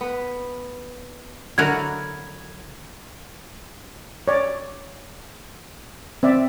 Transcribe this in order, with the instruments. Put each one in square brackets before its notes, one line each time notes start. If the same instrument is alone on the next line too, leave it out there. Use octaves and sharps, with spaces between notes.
[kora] B3 B4
[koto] D3 F#4 A#4 [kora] F#3 E4 D5 [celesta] G#6
[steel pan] C#5 D5
C4 D5 E5